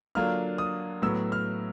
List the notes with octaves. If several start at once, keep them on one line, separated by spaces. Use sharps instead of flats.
D3 F#3 A#3 D4 F4 F6
D#6
A2 F#3 B3 E6
F6